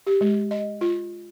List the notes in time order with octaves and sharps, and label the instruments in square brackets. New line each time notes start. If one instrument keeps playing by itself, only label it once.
[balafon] G4
G#3
D#5
F4